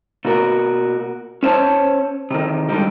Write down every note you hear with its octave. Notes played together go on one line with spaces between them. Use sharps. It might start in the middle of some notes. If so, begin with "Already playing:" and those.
B2 A#3 F#4 A#4
C#4 C5 C#5 A5
C3 D#3
G#2 D3 D#3 G3 G4